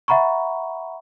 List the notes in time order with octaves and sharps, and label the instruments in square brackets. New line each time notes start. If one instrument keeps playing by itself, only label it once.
[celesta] E5 F#5 A#5 B5 C#6